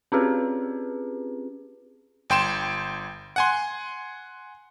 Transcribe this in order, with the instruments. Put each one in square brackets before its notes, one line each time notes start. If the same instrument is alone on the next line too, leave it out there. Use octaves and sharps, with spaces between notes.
[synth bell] C4 C#4 F4 G4 G#4 B4
[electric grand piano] G1 G5 C6 E7
F#5 G#5 C6